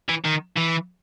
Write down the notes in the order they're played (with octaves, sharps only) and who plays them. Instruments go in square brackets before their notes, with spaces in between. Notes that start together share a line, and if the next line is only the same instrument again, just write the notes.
[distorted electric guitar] E3
D#3
E3